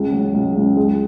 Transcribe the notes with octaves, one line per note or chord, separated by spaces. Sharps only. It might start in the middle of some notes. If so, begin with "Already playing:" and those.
Already playing: C#2 G#3
F#3
C#2
C#2
G#3